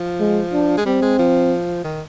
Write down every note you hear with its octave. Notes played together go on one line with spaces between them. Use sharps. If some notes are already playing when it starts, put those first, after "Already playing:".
Already playing: F3
G#3
D4
G#3
G3 C4
G#3
F3
D#3